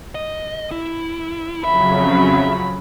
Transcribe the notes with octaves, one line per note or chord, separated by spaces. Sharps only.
D#5
E4
F2 C#3 F#3 E5 B5